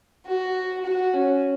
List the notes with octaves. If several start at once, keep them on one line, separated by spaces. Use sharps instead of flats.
F#4
F#4
C#4